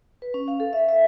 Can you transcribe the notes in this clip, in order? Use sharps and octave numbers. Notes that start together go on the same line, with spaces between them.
B4
C#4
F5
A4
E5
E5